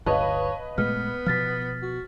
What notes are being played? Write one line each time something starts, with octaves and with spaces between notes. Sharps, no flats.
D1 G1 B4 C#5 D#5 F5 A5
A#2 G#3 A3 B3 F6
B2 F3 F6 A6 B6
F#4